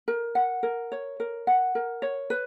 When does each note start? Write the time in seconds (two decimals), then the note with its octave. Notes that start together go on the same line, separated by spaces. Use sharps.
0.08 A#4
0.35 F#5
0.63 A#4
0.92 C#5
1.20 A#4
1.47 F#5
1.75 A#4
2.02 C#5
2.30 B4